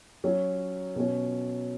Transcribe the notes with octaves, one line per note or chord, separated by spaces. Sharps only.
F#3 C#4
B2 F#3 C#4